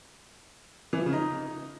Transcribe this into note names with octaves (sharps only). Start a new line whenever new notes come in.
E3
F3
C#3
D#4